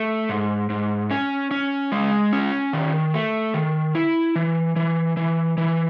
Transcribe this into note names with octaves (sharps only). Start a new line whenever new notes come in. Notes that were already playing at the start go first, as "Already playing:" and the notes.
Already playing: A3
G#2
G#2
C#4
C#4
G#3
C#4
D#3
A3
D#3
E4
E3
E3
E3
E3